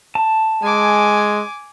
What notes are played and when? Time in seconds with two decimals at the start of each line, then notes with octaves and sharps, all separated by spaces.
0.15 A5
0.63 G#3 G#5 D6